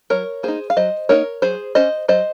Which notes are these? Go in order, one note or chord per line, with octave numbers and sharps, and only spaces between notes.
F#3 A#4 C#5
A#3 D#4 G#4 C5
F5
F#3 C5 D#5
A#3 D#4 A#4 C#5
F#3 G#4 C5
C#4 C5 D#5
F#3 C5 D#5